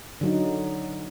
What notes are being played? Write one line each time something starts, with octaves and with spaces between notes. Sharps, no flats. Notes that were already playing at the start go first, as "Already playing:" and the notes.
D3 F#3 D#4